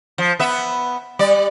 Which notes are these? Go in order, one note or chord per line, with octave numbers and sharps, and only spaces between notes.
F3
B3 E5
G3 D5